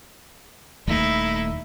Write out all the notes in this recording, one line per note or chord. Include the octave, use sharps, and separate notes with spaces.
D#1 D#2 A3 D#4 E4